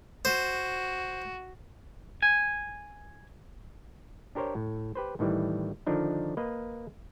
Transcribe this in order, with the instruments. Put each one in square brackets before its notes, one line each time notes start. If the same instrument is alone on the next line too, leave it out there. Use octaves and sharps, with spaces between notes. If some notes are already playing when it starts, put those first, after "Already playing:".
[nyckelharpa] F#4 [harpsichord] C5
[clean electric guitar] G#5
[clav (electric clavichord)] D4 G4 A#4 C5 C#5
A2
G4 B4 C5
A2 D#3 E3 G3
D3 D#3 F3 D4 D#4
A#3 B4 D#5